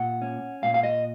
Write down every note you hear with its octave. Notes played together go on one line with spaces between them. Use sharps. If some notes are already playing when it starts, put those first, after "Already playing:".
Already playing: A#2 F#5
C#4
A#2 F5
F5
D#5